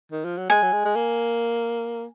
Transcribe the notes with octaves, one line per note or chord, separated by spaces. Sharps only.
D#3
F3
F#3
G#3 G#5
F#3
G#3
G#3
A#3